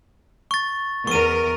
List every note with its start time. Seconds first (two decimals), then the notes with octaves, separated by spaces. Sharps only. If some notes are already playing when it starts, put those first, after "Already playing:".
0.51 C#6 A6
1.07 E2 A#4 C#6 D#7